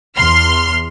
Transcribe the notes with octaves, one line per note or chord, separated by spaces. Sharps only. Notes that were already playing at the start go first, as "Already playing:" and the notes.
E2 C6 F6